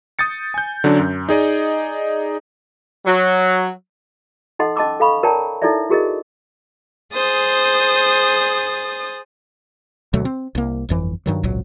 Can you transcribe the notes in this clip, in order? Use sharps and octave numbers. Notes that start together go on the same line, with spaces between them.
D#6 G6 A6 C#7
G#5 G6
D3 F#3 C#4 D4
F#2
D#4 G#4 D5 D#5
F#3
D#4 A4 D#5 F#5 C6
C#4 D#5 A5 C6 D6 E6
A4 F5 B5 C#6
A#4 C#5 D5 G5 A5 A#5
D#4 E4 A4 C#5 D5 E5
E4 F#4 G#4 A#4 C#5 D#5
G#4 C5 D#6 A6
D2 B2 F#3 A3
C4
C2 A#3
G1 F2 E3
G2 D#3 F#3
G#1 C#2 A#2 F#3